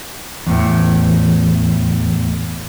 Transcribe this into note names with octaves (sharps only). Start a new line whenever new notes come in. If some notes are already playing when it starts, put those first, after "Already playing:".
E2 A2